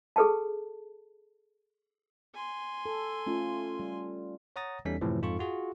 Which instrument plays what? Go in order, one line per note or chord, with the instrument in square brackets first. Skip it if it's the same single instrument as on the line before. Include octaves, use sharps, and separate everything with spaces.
[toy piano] G#4 A4 B4 G5 A5
[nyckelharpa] G#5 C6
[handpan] A4
A3 C#4 F4
G3
[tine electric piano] C#5 F#5 A#5 D#6 A6 A#6
E2 G3 C#4 D#4 A4 B6
F#2 A2 C3 E3 F3
F2 G#2 F4 A4 C#6
F4 F#4 G#4